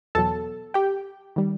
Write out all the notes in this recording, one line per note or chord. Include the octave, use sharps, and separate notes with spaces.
E2 B2 F#3 A4 A5
G4 G5
D#3 G3